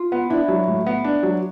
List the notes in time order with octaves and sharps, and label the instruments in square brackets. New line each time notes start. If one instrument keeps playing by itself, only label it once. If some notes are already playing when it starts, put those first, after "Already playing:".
Already playing: [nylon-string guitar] F4
[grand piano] B3
[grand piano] D4 [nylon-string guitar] E4
[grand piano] F#3
A2
B3
D4
F#3